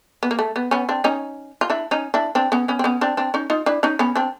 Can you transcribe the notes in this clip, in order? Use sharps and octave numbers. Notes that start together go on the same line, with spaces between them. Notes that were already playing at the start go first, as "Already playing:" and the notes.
B3
A#3
A3
B3
B3 C#4
C4 D4
C#4 D#4
F4
D4 E4
C#4 D#4
D4 E4
C4 D4
B3 C#4
B3 C#4
C4
B3 C#4
C4 D4
C4 D4
C#4 D#4
D#4 F4
D4 E4
C#4 D#4
B3 C#4
C4 D4